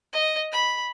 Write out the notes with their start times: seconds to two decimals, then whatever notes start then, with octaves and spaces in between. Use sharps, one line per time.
0.13 D#5
0.52 B5